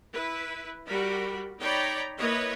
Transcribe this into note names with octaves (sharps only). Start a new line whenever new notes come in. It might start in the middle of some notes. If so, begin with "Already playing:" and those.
E4 B4
G3 F#4 A#4 B5
D#4 C#5 D5 G5 A#5 B5
A#3 E4 B4 C#5 D#5